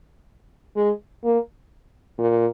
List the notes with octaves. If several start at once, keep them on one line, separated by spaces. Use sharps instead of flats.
G#3
A#3
A#2